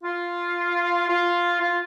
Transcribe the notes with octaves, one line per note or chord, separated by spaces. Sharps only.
F4
F4
F4